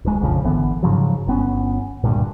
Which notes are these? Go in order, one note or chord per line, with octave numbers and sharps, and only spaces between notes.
D1 G#3
A#1 F2 C#3 F3
G#1 D3 E3 B3
G#2 C#3 F3 F#3
G1 B3 C#4
D2 G2 A#2